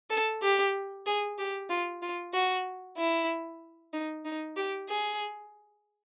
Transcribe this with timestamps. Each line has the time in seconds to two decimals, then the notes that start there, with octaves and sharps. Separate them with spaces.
0.10 A4
0.43 G4
1.06 G#4
1.38 G4
1.70 F4
2.02 F4
2.34 F#4
2.97 E4
3.93 D#4
4.25 D#4
4.56 G4
4.89 G#4